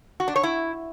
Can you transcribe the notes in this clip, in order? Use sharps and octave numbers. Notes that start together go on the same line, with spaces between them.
F#4
D4
C#5
E4